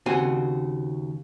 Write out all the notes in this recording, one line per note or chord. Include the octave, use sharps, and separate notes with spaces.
D#2 C#3 C4 F#4 G#5